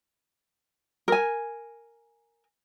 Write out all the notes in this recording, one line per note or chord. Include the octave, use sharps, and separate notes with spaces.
A#4 G#5